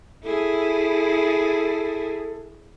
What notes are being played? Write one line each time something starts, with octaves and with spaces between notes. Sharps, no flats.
E4 G#4 A4